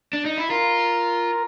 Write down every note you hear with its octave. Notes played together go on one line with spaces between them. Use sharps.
D4
D#4
E4
F4 A#4